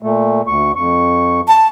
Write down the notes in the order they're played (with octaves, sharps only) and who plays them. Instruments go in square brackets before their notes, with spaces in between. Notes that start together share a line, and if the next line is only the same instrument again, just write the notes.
[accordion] A#2 A3
D2 C#6
F2 C#6
[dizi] A5